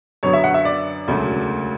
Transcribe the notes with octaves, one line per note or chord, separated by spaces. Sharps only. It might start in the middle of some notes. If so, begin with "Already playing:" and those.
F#2 D3 F#3 B3 C#5
E5
F#5
E5
D5
E1 D2 C#3 F#3 A3